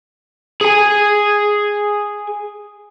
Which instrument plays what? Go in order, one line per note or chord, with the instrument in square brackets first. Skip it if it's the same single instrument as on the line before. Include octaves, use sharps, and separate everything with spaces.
[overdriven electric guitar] G#4 G#5